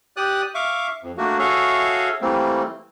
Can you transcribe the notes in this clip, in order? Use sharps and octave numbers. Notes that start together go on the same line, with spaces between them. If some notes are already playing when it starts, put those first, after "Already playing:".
G4 D5 D#6 F#6
E5 F5 C#6 D6
F2
A3 A#3 D4 F#4
F#4 G#4 A4 C#5 E5 F5
E3 G3 A3 A#3 C4